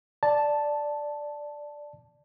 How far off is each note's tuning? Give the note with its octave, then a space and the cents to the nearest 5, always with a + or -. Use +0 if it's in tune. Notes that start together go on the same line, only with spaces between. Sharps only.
D5 +0 A5 +0